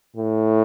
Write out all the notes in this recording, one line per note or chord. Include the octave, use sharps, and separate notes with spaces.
A2